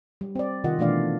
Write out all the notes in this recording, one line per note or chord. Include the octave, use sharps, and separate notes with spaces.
G3
C4 D5
C3 D#3 F4 D#5 F#5
B2 E3 A3 D4 D5 F5